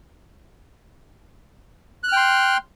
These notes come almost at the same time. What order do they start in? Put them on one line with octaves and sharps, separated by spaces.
F#6 F6 G5 C6